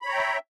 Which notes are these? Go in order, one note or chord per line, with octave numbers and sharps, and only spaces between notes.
C#5 E5 G5 A#5 B5